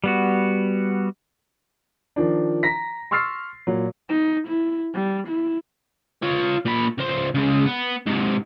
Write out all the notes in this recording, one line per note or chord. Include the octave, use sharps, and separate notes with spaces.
G3 B3 F#4
D#3 F3 D4
A#5 A#6 B6
C6 C#6 E6 F6 A6 C7
A#2 F#3
D#4
E4
G3
E4
F4 C#5
A#2 B5
C#2 C5
C#3 G#3
B3
G#2 C3